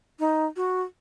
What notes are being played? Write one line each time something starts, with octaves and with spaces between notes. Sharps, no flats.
D#4
F#4